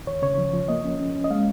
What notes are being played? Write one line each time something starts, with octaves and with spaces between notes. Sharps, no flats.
D#2 C#5
C#3 C#5
F3
F3
A#3 D#5
C#4
C#4
C#4
D#5
G#3 F5